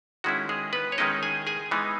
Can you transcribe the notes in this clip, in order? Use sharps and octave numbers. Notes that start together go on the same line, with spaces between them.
D#3 G#3 C#4 E4 F#4
G#3 G#4
B3 B4
C#5
D#3 G#3 C#4 D#4 E4 D#5
G#4 G#5
G#4 G#5
E3 G#3 B3 D#4